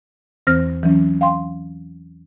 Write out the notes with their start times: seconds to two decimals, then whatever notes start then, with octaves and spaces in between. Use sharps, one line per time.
0.47 E2 E3 C4 C5 F6 A#6
0.83 E3 F#3 C#4
1.21 F5 G5 C6